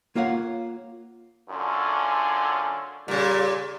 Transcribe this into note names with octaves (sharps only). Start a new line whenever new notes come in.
A#3 F4 C#5 F5 F#5
F#2 D3 C#4 F4
A#2 C#3 G3